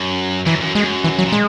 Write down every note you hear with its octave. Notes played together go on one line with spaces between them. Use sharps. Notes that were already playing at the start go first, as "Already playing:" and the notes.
Already playing: F#2
F#2 E3
F#2
F#2 G#3
E3
F#3
A#2
G#3